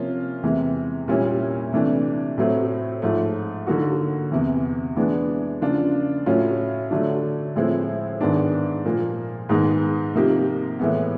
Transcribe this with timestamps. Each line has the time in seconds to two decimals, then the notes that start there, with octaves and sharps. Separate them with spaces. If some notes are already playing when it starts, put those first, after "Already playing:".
Already playing: C3 F3 A#3 C#4 F4
0.43 E2 C3 E3 G#3
1.08 A#2 G3 A#3 C#4 E4
1.72 C3 E3 A3 D4
2.37 A2 F#3 A3 C4
3.02 G#2 F3 A3
3.67 D3 F#3 A#3 D#4 F#4
4.31 E2 C3 E3
4.96 E3 G#3 B3 D4
5.61 C#3 F3 A#3 D4 F4
6.26 A2 F#3 A3 C#4 F4
6.91 D3 F#3 A3 D4
7.56 A2 F3 G#3 C4 E4
8.21 G#2 D#3 G#3 B3 D4
8.85 A#2 F3 A#3
9.49 G#2 D#3 G#3 B3 D#4
10.14 C3 F3 A#3 D#4 G4
10.79 A2 E3 G#3 B3